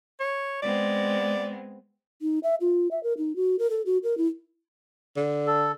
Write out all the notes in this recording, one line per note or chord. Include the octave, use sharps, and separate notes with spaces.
C#5
G#3 B3 C4 D5
D#4
E5
F4
E5
A#4
D#4
F#4
A#4
A4
F#4
A#4
E4
D3
A4